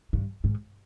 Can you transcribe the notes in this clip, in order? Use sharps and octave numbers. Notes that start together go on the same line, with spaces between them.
G2
G#2